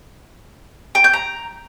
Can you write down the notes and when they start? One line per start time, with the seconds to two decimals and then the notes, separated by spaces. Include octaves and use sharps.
0.95 G5
1.04 G6
1.13 A#5